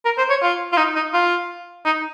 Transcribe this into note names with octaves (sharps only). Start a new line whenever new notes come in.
A#4
C5
C#5
F4
F4
D#4
D#4
F4
D#4